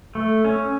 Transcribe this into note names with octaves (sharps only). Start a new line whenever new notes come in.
A3
C#4